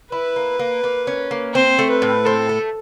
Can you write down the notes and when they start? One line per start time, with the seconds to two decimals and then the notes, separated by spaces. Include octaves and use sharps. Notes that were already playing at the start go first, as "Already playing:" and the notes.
0.12 E4 B4
0.36 A#3
0.59 A#3
0.84 A#3
1.07 C#4
1.31 A#3
1.54 C4 C5
1.79 A3
1.91 B4
2.02 A2
2.25 C4 A4
2.49 A3